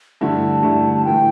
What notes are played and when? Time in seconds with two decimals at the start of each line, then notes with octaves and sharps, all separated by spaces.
0.21 G2 D3 A3 E4 A5
0.63 G2 D3 A3 E4
0.94 A5
1.05 A2 E3 A3 G5